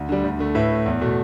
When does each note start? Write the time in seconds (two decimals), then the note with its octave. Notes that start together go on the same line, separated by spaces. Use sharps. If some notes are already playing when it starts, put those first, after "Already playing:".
Already playing: D2
0.09 D3 G3
0.24 D2
0.39 D3 A3
0.55 A2 B4 E5
0.71 A3
0.86 E2
1.01 B2 A3